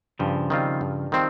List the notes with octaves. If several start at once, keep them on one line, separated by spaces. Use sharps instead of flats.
G2 C#3 F3
D#3 G3 C4 F4
G2
D#3 G3 C4 F4